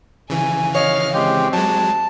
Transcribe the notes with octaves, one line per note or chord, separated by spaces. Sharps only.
C#3 E3 G#5
C#5 D#5 F5 F6
G#3 C4 G4 G5
F#3 G#3 A5